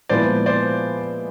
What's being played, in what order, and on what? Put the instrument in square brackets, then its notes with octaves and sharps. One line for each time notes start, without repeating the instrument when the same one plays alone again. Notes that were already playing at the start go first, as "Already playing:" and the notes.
[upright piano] A#2 F3 G#3 B3 E4 [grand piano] C5 D5
[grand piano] C5 D5